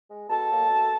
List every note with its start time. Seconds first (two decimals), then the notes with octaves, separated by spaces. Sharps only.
0.10 G#3
0.29 B2 A4 A5
0.49 F#3 A#3
0.69 B2